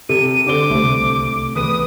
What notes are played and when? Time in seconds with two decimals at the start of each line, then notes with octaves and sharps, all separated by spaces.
0.09 C3 A4 D#7
0.47 D3 C5 D6 G7
0.70 C2 C3 A3
1.55 E2 B4 D#6 D#7